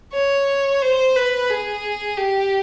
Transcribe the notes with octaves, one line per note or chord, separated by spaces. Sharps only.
C#5
C5
B4
G#4
G4